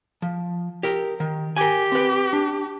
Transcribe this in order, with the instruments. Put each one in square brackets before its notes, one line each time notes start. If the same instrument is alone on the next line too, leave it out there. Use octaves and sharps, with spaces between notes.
[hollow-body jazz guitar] F3
G4 A#4
D#3
[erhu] G4 [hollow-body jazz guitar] A#4 G#5
[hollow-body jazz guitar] C4 B4
D4